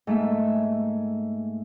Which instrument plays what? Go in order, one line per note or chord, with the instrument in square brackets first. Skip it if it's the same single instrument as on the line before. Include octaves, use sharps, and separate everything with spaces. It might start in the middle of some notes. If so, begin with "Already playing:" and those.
[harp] G#2 A3 A#3 E5